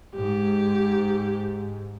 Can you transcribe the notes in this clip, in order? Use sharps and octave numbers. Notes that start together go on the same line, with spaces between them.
G#2 G4